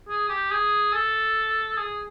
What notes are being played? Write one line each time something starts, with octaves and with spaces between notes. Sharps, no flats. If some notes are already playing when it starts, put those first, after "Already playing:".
G#4
G4
G#4
A4
G#4